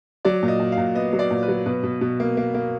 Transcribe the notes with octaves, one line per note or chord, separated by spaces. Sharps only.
F#3 D5
A#2
D#5
A#2
F5
A#2
B3 D#5
F#3
D5
A#2
B4
F#3
B2 B4
B2
B2
A#3
A#3
A#3